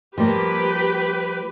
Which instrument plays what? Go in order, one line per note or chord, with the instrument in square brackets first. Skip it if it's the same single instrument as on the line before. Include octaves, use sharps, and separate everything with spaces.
[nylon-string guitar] F3 G3 A#3 [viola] G4 B4